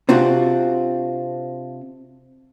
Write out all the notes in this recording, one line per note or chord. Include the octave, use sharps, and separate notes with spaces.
C3 C4 D4 F4 F#4